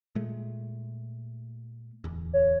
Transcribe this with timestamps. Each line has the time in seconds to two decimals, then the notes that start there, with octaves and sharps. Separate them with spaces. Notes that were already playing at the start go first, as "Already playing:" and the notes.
0.15 A#2 G#3 A3
2.04 D1 E2
2.33 C#5